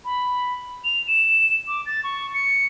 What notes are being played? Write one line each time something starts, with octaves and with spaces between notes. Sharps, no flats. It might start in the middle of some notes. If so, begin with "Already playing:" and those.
B5
F7
E7
D6
A6
C#6
C#7